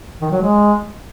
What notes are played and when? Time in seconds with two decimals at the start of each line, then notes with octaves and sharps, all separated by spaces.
0.21 D#3
0.31 F#3
0.42 G#3